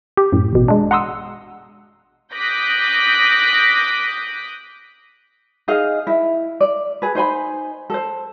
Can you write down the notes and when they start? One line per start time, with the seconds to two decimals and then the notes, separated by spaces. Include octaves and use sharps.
0.17 G4
0.32 F#2 A2
0.53 A1 B2
0.68 G#3 D4
0.91 F#5 A#5 C6 D#6 E6
2.34 D6 D#6 F#6 G6 A#6 B6
5.68 D#4 G#4 D#5 F5
6.07 E4
6.61 D5
7.02 G#4 B4
7.15 D#4 C5 G#5 B5
7.90 A4 C5